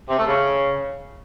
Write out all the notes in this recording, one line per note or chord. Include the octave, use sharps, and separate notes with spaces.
C3
A3
C#3